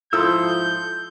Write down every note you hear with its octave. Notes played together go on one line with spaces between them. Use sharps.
G#2 F3 E4 A4 C6 D#6 E6 G6